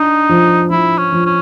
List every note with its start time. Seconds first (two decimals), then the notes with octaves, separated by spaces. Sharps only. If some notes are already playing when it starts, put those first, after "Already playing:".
Already playing: D4 D#4
0.29 F3
0.70 F3 E4
0.98 C#4
1.12 F3
1.26 C#4